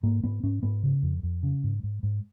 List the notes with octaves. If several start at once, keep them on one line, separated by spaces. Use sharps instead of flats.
G#2 A#3
G#2 B3
G#2 C#4
G#2 B3
C#3
F2
F2
C#3
G#2
G#2
G#2